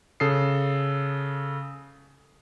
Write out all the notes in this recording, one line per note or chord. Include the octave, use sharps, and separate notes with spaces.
C#3 A4 D#6 C7